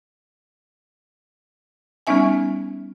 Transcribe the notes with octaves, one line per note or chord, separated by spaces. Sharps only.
G3 B3 C#4 D#4 E5 G#5